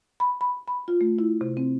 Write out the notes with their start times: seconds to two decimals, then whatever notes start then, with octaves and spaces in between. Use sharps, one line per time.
0.20 B5
0.41 B5
0.68 B5
0.88 F4
1.01 A3
1.19 E4
1.41 C3
1.57 C4